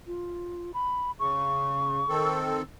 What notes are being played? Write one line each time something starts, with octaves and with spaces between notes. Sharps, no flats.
F4
B5
C#3 C#6
D#3 C4 A4